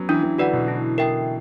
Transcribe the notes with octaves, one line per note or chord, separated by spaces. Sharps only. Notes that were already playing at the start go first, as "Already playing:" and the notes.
Already playing: F#3 B3 C#4
E3 D4
E3
D3 F#4 B4 D5 F#5
B2
E4
A#4 E5 G5